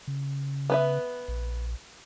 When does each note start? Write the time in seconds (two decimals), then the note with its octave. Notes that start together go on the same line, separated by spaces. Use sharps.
0.08 C#3
0.70 B3 B4 E5
1.28 A#1